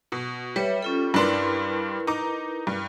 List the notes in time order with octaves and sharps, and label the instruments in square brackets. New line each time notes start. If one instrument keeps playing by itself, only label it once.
[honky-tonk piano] B2
[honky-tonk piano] G3 [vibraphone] B4 C#5 E5
[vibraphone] C#4 F4 A4
[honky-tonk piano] G2 D4 C6 [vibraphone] E4 A#4 B4
[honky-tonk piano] D#4 D6
G2